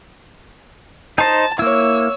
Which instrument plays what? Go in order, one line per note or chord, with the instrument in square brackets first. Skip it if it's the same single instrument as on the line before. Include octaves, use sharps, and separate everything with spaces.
[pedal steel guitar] D#4 C5 D#5 [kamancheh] A5
[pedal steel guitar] A#3 E4 [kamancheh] C#5 E6